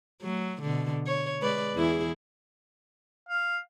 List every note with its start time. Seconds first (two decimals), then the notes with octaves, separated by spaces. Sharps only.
0.22 F#3 A3
0.63 B2 D3
1.07 C#5
1.41 G#3 B4 D5
1.75 E2 E4 G#4
3.29 F5